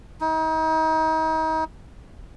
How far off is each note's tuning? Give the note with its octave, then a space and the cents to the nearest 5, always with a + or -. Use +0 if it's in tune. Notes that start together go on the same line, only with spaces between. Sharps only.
D#4 +35